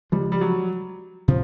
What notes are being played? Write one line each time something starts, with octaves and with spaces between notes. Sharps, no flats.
C#3 F3 G3 G#3
G3
F#3
C3 F3